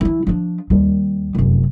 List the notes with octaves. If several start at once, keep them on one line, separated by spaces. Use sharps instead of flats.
E3 E4
F3 D4
D#2 G3
F1 F#2